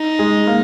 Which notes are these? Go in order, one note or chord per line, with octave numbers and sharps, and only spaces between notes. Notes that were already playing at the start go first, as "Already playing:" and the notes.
Already playing: D#4
G#3
A#3